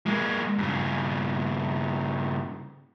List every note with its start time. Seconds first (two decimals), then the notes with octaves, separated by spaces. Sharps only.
0.06 G#3 A#3
0.58 G2 C#3